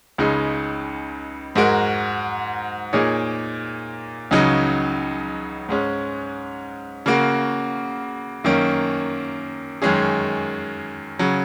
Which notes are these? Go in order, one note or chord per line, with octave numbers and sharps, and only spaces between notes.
C#2 C#3 G#3 D#4
G#2 G#3 F#4 A#4
A#2 A#3 D#4 G#4 C#5
C#2 C#3 F#3 D#4
G#2 G#3 C#4
C#3 A#3 F#4
F#2 D#3 A#3 C#4
F#2 D#3 G#3 C#4 G#4
C#3 F#3